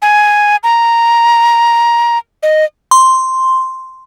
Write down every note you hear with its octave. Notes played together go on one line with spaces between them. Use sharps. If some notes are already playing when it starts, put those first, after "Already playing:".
G#5
A#5
D#5
C6